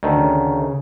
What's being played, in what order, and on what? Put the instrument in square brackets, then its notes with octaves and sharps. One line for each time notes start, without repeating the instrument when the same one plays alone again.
[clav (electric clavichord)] D2 D#3 A3
[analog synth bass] C#3